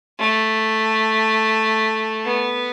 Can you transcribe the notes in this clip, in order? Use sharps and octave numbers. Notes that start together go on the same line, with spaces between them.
A3
B3